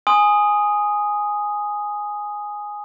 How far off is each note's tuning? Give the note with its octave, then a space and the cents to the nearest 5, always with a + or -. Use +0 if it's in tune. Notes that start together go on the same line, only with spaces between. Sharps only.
G#5 +0 C6 +0 D#6 +0